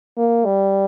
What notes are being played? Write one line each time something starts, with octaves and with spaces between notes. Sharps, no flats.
A#3
G3